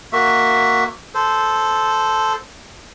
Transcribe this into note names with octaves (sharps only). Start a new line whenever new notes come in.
A#3 F#4 E5
A4 C5